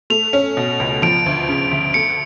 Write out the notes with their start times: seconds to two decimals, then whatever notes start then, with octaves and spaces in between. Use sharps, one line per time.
0.10 A3 F7
0.33 C#4
0.57 B2
0.80 C#2
1.02 F3 D7
1.26 D2
1.49 C#3
1.71 D2
1.94 A3 C#7